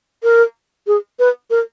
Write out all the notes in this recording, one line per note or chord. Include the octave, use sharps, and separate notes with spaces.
A#4
G#4
B4
A#4